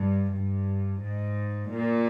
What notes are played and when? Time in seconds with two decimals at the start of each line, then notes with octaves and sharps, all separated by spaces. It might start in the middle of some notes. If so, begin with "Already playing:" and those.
Already playing: G2
0.32 G2
1.02 G#2
1.70 A#2